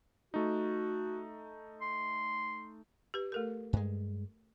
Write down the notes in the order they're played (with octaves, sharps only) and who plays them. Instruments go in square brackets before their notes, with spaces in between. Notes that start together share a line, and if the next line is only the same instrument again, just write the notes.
[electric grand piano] A3 D#4 [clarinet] F#4
[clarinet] C6
[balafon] G4 B4
A3 A4 A#4
[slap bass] G2 G#3